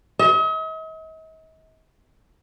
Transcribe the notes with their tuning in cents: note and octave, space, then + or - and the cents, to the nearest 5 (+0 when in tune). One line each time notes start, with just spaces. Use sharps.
D#5 +45